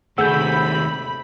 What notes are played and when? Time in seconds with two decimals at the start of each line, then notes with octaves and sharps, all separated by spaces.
0.18 D#2 C3 A3 G#4 F#5 B5 E6 G6